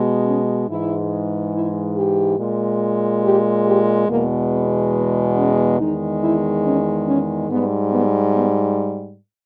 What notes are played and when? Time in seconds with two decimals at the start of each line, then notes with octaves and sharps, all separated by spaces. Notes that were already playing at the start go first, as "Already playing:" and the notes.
Already playing: B2 G#3
0.26 C#4
0.69 G#2 E3 G#3 E4
1.54 E4
1.97 G4
2.39 A#2 G#3
3.24 G4
3.67 G4
4.09 E2 B2 G#3 A#3
4.52 B3
4.94 B3
5.37 C#4
5.79 E2 D#3 G#3 D#4
6.22 E4
6.64 C#4
7.07 C#4
7.49 G#2 G3 B3
7.92 B3
8.34 B3